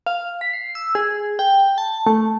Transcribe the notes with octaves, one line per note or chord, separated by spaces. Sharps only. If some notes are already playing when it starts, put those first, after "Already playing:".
F5
B6
C7
E6
G#4
G5
A5
A3